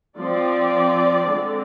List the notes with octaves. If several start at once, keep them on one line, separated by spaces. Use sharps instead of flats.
F3 C4 D5
D3 G#3 C4